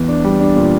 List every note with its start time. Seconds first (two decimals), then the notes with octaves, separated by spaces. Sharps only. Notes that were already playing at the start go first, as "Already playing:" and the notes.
Already playing: E2
0.08 D4
0.24 G3
0.40 D4
0.56 A#2